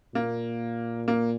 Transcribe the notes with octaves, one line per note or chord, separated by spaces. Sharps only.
A#2 A#3
A#3